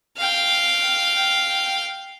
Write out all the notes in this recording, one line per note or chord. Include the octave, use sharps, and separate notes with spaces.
F5 G5